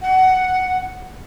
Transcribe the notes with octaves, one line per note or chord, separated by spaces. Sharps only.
F#5